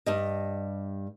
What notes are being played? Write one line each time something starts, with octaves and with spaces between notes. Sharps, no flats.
G2 G3 D#5